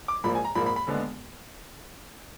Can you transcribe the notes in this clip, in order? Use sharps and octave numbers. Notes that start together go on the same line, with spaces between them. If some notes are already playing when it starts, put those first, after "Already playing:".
D6
A#1 G#2 F3 A#3 B5
G#5
A#5
A#1 G#2 F3 A#3 B5
B5
B5
D#2 D3 G#3 B3